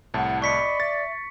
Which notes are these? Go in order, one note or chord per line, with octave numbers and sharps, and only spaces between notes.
C2 A2 F#5 A5 G#6
D5 D#5 B5 C#6 B6 C#7
E5 A6